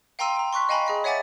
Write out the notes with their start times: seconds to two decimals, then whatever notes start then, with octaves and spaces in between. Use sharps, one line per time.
0.19 F5 G5 A#5 C6 E6 D#7
0.37 G5 A#5
0.53 C6 C#6 F#6 B6
0.69 D#5 F5 G5 G#5 A#5 B5
0.86 G#4 D#5 B6
1.04 C#5 E5 F#5 G#5 D6 A6